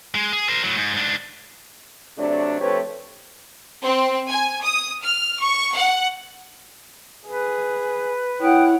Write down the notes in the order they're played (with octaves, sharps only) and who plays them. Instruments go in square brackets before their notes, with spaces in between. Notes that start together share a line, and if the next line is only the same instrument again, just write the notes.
[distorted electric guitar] G#3
G#4
A#4 C5
A2 F#3
G#2
G#2 D4
[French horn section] C3 F#3 A3 D4
F3 A3 C4 G4 B4 C#5
[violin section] C4
G#5
D#6
F6
C#6
F#5
[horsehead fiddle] G#4 [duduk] B4
[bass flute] E4 [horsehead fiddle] C#5 F#5 [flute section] G5 D#6 F#6